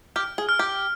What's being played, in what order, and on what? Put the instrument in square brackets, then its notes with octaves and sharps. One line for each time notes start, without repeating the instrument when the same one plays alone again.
[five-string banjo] G4 [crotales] F6
[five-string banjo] G#4
[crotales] F6
[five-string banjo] G4